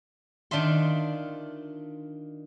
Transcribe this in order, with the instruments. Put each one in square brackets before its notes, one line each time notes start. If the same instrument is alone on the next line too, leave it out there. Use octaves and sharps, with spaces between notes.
[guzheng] D#3 D4 F4 E5 C6